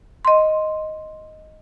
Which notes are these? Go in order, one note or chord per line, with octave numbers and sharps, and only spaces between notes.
D#5 C6